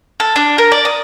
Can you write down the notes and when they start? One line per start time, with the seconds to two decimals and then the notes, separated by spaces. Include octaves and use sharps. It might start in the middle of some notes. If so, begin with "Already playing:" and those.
0.20 A4
0.36 D4
0.58 A#4
0.72 D5
0.85 D#6